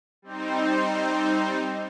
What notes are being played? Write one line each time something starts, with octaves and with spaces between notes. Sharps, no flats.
G3 C4 D#4 C5